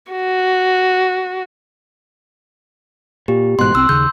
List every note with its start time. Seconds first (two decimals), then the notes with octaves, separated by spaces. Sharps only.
0.12 F#4
3.28 A#2 G4
3.59 A1 G#2 B2 C6 F#6
3.74 C2 C4 C6 E6
3.89 D#2 C#3 G6